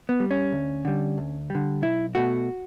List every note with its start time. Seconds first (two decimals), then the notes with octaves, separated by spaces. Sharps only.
0.09 B3
0.20 G3
0.31 C#4
0.52 D2
0.85 D3 G3
1.18 D2
1.50 D3 G3
1.82 B1 E4
2.15 B2 A3 F#4